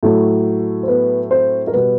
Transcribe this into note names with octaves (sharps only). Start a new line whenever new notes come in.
A2 F#3 A3
C5
B3 B4
C4 C5
A#4
B2 G3 B3 B4